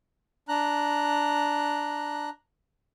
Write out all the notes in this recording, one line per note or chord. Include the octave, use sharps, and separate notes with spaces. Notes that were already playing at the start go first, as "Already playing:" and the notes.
D4 A#5 F#6